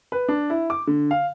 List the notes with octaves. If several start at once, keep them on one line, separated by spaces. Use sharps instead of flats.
B4
D4
E4
D6
D3
F5